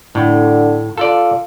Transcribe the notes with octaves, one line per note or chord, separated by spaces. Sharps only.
A2 D3
F4 A4 D5